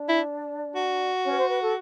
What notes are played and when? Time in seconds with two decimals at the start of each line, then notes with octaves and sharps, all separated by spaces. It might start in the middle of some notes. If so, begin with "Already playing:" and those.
Already playing: D4 D5
0.09 E4
0.75 F#4
1.25 C#4 C#5
1.32 B4
1.37 C5
1.49 B4
1.61 A4